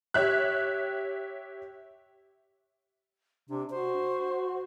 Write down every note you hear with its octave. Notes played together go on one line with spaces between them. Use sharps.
G4 C#5 E5 F#6
C3 D4
F#4 C5